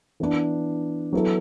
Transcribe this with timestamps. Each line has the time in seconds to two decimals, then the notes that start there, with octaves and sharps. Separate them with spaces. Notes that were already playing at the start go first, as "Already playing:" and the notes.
0.20 E3 B3 D4
1.13 F#3 B3 E4 A4